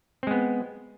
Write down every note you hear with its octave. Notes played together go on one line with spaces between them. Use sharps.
G#3 B3 C4